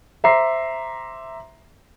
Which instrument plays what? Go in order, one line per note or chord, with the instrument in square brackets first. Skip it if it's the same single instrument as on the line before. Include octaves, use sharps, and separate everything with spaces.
[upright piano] C5 E5 A#5 C6 D6 C7